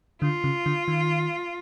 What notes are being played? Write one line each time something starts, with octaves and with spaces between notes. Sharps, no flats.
D3 F4
C#3
D3
D#3